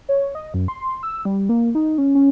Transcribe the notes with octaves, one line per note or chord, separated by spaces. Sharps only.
C#5
D#5
F#2
C6
E6
G3
A#3
D#4
C#4
C#4